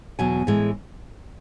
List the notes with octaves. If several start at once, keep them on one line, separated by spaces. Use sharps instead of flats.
E2 B2 F#3 G#5
A2 E3 G#3